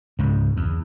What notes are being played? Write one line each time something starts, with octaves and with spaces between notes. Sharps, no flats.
C#2 G#2
E2